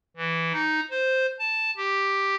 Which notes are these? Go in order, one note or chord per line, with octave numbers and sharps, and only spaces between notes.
E3
D#4
C5
A5
G4